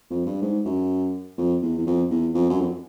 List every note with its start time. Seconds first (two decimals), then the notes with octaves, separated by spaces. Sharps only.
0.10 F2
0.26 G2
0.42 G#2
0.65 F#2
1.38 F2
1.62 E2
1.78 E2
1.87 F2
2.10 E2
2.34 F2
2.50 F#2
2.60 F2